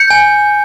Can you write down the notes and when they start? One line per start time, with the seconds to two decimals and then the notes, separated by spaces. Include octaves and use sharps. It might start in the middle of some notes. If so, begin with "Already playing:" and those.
Already playing: G6 C#7
0.10 G#5